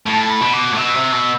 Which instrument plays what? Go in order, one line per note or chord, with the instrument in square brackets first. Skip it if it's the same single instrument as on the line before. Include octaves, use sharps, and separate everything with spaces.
[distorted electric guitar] A2 [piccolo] A5
[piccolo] B5
[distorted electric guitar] B2
[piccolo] D6
[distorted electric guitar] A2
[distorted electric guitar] B2 [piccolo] E6
[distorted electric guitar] C3
B2